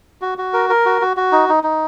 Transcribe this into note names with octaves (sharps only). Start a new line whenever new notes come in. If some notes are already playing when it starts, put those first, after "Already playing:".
F#4
F#4
A#4
A#4
F#4
F#4
F#4
D#4
D#4
D#4